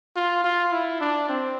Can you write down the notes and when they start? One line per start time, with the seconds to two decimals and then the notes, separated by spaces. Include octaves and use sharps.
0.16 F4
0.44 F4
0.72 E4
1.01 D4
1.29 C4